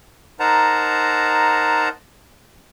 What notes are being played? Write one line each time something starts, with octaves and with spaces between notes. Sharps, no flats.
D#4 A#4 C5 F#5 A5 A#5